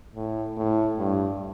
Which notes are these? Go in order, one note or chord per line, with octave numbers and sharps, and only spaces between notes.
A2
A2
G2